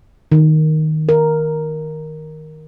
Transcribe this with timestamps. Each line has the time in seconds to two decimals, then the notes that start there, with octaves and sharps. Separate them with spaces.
0.32 D#3
1.09 A#4